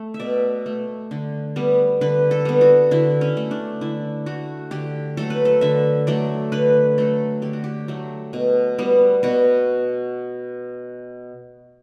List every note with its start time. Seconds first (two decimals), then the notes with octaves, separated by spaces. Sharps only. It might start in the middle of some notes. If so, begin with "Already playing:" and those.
Already playing: A3
0.14 E5
0.19 B2 D5
0.66 A3
1.11 D3
1.56 G3 B3
2.01 D3 B4
2.31 A4
2.45 G3 B3
2.61 F#4
2.91 D3 E4
3.21 C#4
3.37 A3
3.51 D4
3.81 D3 E4
4.26 A3 F#4
4.71 D3 G4
5.17 F#3 A3 A4
5.30 B4
5.45 A4
5.61 D3 E5
6.07 F#3 A3 D5
6.52 D3 B4
6.98 F#3 A3 A4
7.42 D3 G4
7.53 F#4
7.64 G4
7.88 F#3 A3
8.33 B2
8.78 G3 B3
9.23 B2 F#4